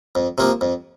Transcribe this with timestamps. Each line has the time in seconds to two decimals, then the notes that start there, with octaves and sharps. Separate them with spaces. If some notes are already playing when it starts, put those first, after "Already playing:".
0.15 F2
0.38 C3 F3 A#3
0.61 F2